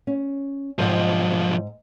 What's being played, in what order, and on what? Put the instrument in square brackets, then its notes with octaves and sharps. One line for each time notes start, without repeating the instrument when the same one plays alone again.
[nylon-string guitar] C#4
[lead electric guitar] B1 F3 [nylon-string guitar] G#2 D#5 G5